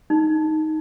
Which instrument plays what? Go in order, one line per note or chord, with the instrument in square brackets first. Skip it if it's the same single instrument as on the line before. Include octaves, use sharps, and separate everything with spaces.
[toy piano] D#4